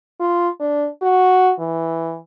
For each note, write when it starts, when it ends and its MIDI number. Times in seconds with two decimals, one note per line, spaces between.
0.20 0.49 65
0.60 0.87 62
1.02 1.52 66
1.59 2.18 52